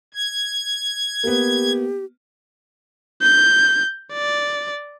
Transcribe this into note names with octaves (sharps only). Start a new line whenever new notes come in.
G#6
A#3 B3 G4
G6
D5